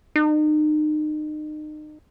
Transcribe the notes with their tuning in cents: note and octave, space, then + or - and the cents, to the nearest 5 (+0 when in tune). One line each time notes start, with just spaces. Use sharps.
D#4 -35